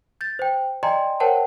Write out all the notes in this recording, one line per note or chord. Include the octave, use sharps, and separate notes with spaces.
G6 A6
C5 G5
D5 D#5 G5 G#5 A#5 C6
A#4 C5 C#5 F#5 G5 A5